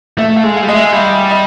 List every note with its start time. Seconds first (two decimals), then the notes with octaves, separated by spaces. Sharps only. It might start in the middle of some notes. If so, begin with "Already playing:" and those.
0.18 A3 E5
0.36 F5
0.43 G#3
0.56 F5
0.62 G3
0.68 G#3 D#5
0.74 E5
0.93 G3 E5
1.31 D#5